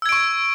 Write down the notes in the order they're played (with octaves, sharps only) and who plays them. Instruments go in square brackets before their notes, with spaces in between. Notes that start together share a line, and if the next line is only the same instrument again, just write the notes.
[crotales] E6
G#6
D7
C#6